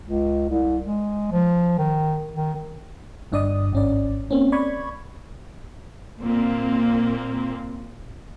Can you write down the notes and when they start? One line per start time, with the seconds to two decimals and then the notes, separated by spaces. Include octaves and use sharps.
0.05 C#2
0.49 C2
0.84 G#3
1.32 F3
1.78 D#3
2.34 D#3
3.32 G1 G2 D4 D5 D#5 D#6
3.73 G#1 C#4 D5
4.31 A#3 C4 C#4
4.52 D5 B5 C#6 G#6
6.22 A#2 A#3 C4